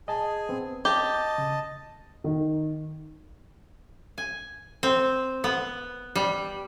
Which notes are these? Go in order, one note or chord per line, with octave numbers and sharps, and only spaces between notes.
G#4 D#5 G#5 A5
B3 C4
G4 D#5 A5
C#3
D#3
G#5
C4
B3
G3